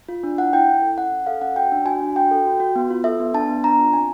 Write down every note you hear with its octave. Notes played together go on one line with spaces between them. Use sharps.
F4
D4
E4 F#5
E4 G5
E4
A4
C#4 F#5
C#4
A4 F5
C#4 F#5
F#4 G5
D4
F#4 G#5
D4
F#4 G5
A4
F#4
F#4
B3
F4
A4 E5
B3
D4 A5
B3
D4 A#5
F4
C4 G#5